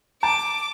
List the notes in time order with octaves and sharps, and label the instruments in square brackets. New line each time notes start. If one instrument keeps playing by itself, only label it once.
[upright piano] A5 [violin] D6